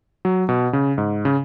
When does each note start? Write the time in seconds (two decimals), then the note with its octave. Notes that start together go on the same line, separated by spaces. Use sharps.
0.25 F#3
0.49 B2
0.73 C#3
0.98 G#2
1.25 C#3